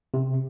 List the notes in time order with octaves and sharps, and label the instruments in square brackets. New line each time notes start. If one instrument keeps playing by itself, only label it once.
[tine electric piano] C3